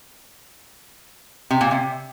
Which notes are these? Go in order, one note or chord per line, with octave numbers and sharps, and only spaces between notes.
C3
A#2
C3